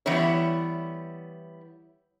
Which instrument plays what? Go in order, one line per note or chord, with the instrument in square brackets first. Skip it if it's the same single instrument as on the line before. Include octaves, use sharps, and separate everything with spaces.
[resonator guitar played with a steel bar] E3 G3 B3 E4 C#5